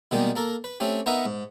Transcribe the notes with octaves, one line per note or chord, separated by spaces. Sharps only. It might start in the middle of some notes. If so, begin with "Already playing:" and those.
B2 D#3 G3 G#3 A#3 G4
A#3 A4 A#4
B4
A3 C4 C#4 G4
B3 D#4 A#4 B4 E5 F#5
G#2